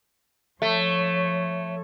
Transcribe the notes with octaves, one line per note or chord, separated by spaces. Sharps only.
F3 A3 C#5